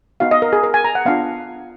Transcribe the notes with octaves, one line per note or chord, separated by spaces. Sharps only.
B3 D#4 F#4 F5
D#5
A#4
G#4
A#4
G#5
A#5
F#5
B3 D4 F4 F5